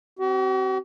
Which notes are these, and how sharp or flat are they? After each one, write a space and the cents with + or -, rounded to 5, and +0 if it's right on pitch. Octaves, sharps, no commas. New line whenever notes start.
C4 +0 F#4 +45